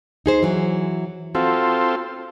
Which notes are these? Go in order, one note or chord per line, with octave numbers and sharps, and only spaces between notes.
D#4 G#4 C5
E3 F#3
C4 F4 F#4 A4